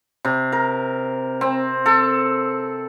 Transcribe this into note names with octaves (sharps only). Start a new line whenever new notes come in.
C3
A#4
C4
A4